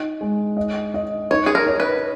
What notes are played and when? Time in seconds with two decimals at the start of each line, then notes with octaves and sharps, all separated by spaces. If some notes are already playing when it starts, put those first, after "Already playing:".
Already playing: D#4
0.21 G#3
0.57 D#5
0.94 D#5
1.31 D#4 C#5
1.46 G#4
1.55 A#4
1.66 C#5
1.80 B4